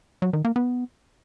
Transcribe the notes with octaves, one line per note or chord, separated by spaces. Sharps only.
F#3
D#3
A#3
B3